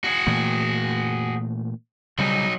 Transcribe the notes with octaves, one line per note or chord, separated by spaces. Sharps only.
F#4 G#4
A#2 E3 A3
C#3 F#3 G3 D#4